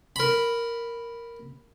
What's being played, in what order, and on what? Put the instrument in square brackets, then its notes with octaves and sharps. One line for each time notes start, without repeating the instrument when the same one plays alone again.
[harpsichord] A#4 B5